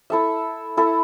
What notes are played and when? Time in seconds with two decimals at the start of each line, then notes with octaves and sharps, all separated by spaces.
0.10 E4 A4 E5
0.77 E4 A4 E5